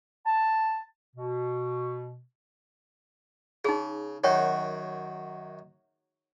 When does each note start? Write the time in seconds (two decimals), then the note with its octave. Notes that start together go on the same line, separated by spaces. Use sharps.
0.25 A5
1.16 B2
3.65 C#3 D#4 G#4
4.24 F#2 D#3 F#4 C#5 G5